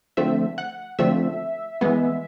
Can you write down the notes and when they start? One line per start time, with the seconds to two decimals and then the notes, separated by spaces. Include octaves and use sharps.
0.17 D3 F3 A3 C4 E5
0.58 F#5
0.99 D3 F3 A3 C4 E5
1.81 E3 G#3 B3